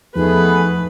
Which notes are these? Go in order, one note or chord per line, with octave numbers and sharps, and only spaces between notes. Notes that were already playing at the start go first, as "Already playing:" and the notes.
E2 F3 A3 B3 D#4 G#4 B4